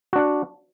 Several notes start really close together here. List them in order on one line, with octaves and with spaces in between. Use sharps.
F#4 D4 F#5